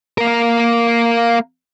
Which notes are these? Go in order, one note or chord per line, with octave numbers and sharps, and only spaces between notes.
A#3 A#4